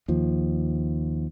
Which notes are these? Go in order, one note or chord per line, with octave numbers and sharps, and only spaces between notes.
D#2 F3